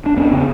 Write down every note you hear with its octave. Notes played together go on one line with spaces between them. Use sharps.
D4
F2 B3 C#4
C#3